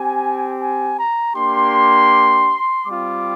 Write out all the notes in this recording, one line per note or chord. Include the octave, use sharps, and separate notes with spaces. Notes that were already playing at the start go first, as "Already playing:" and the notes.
Already playing: C4 G4 G#5
G#5
A#5
A#3 D4 G4 C6
G3 C4 F4 D6